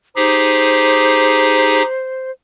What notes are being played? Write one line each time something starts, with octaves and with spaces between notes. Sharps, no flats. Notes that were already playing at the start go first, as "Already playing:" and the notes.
D#4 G4 G#4 C5